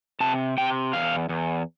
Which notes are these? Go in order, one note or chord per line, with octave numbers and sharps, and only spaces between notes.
C3 A5
C3 G5
E2 F5
E2